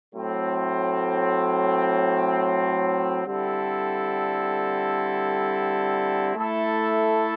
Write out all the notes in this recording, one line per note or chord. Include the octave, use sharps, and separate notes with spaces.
A2 F#3 A3 C4
D3 G3 C4 E4 A4
A3 E4 A4